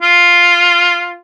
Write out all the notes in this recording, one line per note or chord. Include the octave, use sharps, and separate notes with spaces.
F4